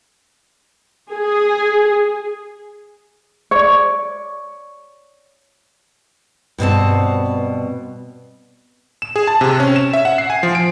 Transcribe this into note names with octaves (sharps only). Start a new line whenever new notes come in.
G#4
C#5 D5
G2 B2 C4 A5
E7
G#4
A5
C3
C#4
E7
E5
F#5
C7
G#5
F3
D7